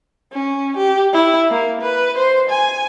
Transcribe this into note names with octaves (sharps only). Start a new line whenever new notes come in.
C#4
G4
E4
A#3
B4
C5
G#5